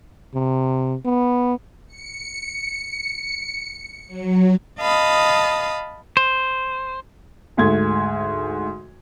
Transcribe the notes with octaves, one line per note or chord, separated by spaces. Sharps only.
C3
B3
C#7
F#3
D#5 F5 A5 B5 D#6
C5
D2 G#2 A3 G#6